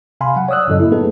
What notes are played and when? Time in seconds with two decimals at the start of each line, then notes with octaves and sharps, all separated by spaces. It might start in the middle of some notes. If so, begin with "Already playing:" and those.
0.21 C3 F5 G#5 B5 C6
0.36 F#3 F#5
0.49 C#5 D5 D#6 E6 F#6
0.68 F#2 A2 C#3 F#3 A4 D#5
0.80 A#3 E4
0.92 A3 B3 D#4 G#4 A4 B4